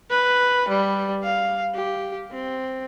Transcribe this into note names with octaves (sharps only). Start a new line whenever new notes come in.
B4
G3
F5
G4
C4